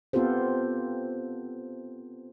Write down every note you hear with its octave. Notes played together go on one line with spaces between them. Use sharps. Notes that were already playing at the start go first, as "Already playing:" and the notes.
B3 C4 F4 G4 A4 C5